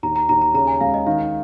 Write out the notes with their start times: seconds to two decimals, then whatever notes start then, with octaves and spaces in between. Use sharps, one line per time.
0.03 D#2 A#5
0.16 A#5
0.29 D#2 A#5
0.42 A#5
0.54 C#3 A#5
0.67 G#5
0.81 C#2 F5
0.94 D#5
1.06 D#3 F5